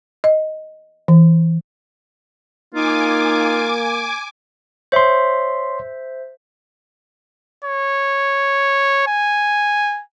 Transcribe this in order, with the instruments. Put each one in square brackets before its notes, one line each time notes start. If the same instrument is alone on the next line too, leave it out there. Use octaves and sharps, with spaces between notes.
[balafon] D#5
E3
[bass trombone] A#3 [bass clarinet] D#4 [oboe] F4 [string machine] G#5 D6
[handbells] C5 E5 [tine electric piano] C#5 C6
[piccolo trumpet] C#5
G#5